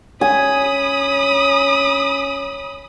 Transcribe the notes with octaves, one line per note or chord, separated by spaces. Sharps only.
C#4 G#5 B5 D#6